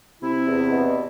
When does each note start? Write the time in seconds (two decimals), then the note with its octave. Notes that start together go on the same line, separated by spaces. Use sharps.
0.23 C3 E4
0.48 E2
0.72 B2